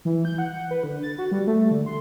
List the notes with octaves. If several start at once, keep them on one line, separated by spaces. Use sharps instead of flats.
E3
G6
F#5
B4
D3
A6
F#4
G3
A3
D3
C6